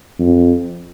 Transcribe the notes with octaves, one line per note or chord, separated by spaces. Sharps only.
F2